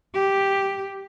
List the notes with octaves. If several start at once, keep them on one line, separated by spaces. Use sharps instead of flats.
G4